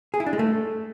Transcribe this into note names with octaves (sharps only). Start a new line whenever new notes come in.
G#4
E4
D4
G#3
A3